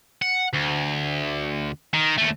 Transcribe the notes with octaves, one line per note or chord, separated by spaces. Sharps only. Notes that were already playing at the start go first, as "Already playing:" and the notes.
F#5
D2
D#3
D#2 A3